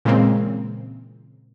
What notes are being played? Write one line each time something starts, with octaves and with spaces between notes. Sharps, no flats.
A#2 C#3 E3 G#3 A#3 C4